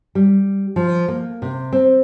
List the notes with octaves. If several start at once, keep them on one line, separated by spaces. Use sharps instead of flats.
G3
F3
A#3
C3
C4